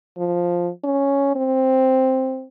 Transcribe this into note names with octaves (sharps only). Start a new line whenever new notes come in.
F3
C#4
C4